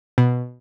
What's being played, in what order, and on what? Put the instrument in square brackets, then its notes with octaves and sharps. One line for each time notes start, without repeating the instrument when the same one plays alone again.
[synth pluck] B2